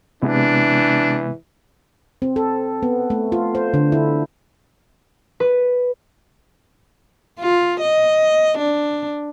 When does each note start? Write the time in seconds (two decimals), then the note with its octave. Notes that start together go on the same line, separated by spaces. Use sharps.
0.23 C3 E3 G#3 B3 D4
2.22 C4
2.36 A4
2.83 B3
3.10 A3
3.32 F4
3.55 C5
3.74 D3
3.92 E4
5.40 B4
7.39 F4
7.80 D#5
8.58 D4